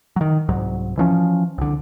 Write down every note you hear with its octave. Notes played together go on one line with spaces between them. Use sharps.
D#3 F#3
C2 G#2 F#3
E3 F3 C#4
C2 D3